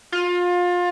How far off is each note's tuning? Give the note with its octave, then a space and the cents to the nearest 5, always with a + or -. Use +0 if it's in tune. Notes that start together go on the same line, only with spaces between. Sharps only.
F4 +25